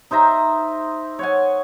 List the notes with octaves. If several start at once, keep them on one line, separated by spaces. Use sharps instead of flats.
D#4 C5 E5 A#5
C#5 F#5 G#5